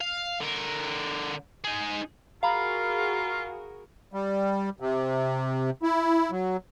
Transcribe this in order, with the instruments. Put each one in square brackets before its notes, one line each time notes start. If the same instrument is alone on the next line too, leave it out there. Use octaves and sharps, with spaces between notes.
[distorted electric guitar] F5
D3 A#4
D#4 G#4
[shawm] F4 [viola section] F#4 G#4 A#4 [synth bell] F5 A#5 B5
[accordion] G3
C3
E4
F#3